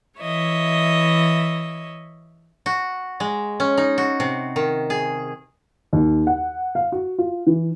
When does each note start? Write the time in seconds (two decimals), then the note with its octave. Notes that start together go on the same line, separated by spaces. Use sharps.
0.21 E3 C#5 D#5 E5
2.66 F#4
3.20 G#3
3.60 C#4
3.78 D#4
3.98 F#4
4.20 C3
4.56 D#3
4.90 G#4
5.93 D#2
6.27 F#5
6.75 F5
6.92 F#4
7.18 F4
7.47 E3